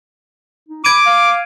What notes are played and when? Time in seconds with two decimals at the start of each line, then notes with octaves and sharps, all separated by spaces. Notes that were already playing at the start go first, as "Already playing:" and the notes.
0.68 D#4
0.85 B5 D6 G#6 D7 D#7
1.06 F5